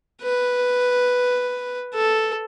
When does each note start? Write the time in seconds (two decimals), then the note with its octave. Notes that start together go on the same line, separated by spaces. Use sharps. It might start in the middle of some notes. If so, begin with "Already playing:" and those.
0.23 B4
1.95 A4